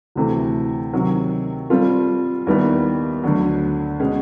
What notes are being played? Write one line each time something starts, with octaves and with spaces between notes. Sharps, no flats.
D2 C3 E3 A3
C3 D#3 F#3
G3 C4 F4 A4
D#2 D#3 G3 B3 E4
D2 D3 F#3
B2 G#3 C#4